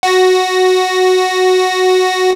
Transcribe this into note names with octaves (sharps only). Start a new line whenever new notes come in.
F#4 A#6